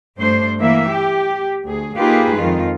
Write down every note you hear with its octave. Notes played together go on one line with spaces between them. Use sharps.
G2 A3 D4 C5
E3 A#3 E5
G4
D2 G#4
A#3 D#4 F4 G4 G#4 B4
F2 D#3 G#3 F4